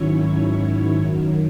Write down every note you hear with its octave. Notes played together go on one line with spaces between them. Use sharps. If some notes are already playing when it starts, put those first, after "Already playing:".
Already playing: G#2 D#3 F#3 C#4 E4 C#5
F#2 D#3 F#3